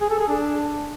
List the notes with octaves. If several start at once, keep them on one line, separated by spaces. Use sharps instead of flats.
G#4
A4
G#4
D4